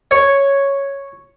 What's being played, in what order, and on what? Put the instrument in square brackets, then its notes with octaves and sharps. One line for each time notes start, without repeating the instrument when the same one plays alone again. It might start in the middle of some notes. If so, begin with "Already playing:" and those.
[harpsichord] C#5